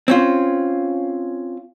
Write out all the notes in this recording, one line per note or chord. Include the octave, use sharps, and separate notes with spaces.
C4 C#4 F4